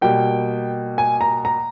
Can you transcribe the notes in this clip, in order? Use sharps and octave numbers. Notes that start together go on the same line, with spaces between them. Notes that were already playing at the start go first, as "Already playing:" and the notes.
B2 G3 A#3 G5
G#5
A#5
A#5